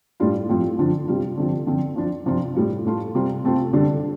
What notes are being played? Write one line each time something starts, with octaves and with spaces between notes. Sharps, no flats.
A2 G3 D4 F4
A2 F3 C4 F4
D3 F3 D4 F4
C3 G3 F4
D3 F3 C4
D3 F3 C4 F4
F3 D4 F4
C3 F3 D4 F4
A2 G3 F4
A2 A3 F4
C3 G3 F4
C3 A3 C4 F4
D3 G3 D4